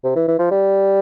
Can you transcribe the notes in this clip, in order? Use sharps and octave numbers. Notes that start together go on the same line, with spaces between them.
C3
E3
E3
F3
G3